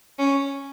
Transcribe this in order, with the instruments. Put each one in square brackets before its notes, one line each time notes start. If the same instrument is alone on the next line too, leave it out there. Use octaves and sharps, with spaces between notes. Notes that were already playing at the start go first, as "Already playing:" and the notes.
[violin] C#4